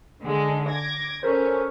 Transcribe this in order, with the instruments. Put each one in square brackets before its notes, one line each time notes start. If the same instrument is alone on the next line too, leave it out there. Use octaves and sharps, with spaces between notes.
[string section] D3 G#3
D6 G#6 A#6
[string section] C#4 [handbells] A4 A#4 C5